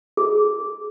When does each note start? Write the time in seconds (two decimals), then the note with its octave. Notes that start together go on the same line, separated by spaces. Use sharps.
0.17 G#4